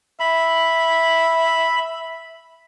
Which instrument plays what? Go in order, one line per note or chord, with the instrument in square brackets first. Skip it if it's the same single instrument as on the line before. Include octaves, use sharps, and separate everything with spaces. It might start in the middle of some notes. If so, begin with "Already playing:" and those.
[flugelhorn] E5 [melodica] B5